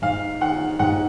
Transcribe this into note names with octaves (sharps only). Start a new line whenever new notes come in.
G#2 F5
D#3 F#5
G#2 F#5